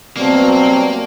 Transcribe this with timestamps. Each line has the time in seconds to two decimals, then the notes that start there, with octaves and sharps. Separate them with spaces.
0.17 B2 F#3 G3 A#3 C4 D5 A5